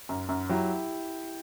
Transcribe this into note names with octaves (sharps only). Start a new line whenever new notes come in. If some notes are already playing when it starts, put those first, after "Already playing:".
F#2
F#2
F#3 E4 G4